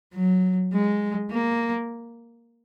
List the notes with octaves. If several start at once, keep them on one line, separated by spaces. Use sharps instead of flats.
F#3
G#3
A#3